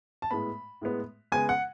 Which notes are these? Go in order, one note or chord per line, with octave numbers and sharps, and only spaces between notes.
A5
A2 G#3 B3 B5
A2 G#3 B3
C#3 G#3 B3 G#5
F#5